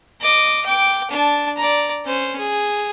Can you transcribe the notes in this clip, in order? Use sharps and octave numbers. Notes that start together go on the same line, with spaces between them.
D#5 D6
G5 D6
D4 A5
D5 A#5
C#4 C5
G#4